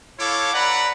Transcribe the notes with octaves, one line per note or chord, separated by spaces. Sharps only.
E4 A4 C#5 F5 D6
B4 D5 F#5 A#5 B5